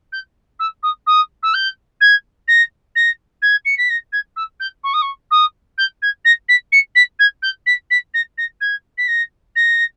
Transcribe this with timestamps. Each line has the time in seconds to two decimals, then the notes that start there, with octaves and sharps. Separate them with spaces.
0.13 G6
0.60 E6
0.83 D#6
1.07 D#6
1.43 E6
1.54 G6
2.01 G#6
2.48 A#6
2.96 A#6
3.42 G#6
3.65 C#7
3.78 B6
3.90 A#6
4.13 G#6
4.36 E6
4.60 G6
4.84 C#6
4.94 D#6
5.02 C#6
5.31 D#6
5.78 G6
6.02 G#6
6.25 A#6
6.49 B6
6.72 C#7
6.95 B6
7.19 G#6
7.43 G6
7.66 B6
7.91 B6
8.14 A#6
8.38 A#6
8.61 G#6
8.98 B6
9.08 A#6
9.56 A#6